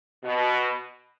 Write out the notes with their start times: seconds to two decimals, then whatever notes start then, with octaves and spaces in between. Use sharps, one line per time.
0.24 B2